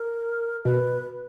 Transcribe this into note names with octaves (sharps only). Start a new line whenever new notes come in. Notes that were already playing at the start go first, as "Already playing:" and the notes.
Already playing: A#4
B2 B4